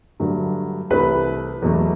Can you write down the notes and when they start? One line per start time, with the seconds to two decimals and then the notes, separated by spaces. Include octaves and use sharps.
0.20 G2 D3 F#3 A3
0.90 C2 C3 E3 A3 B4 B5
1.62 E2 B2 F#3 A3